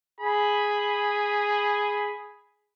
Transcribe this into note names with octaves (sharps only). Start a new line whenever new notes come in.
G#4 B5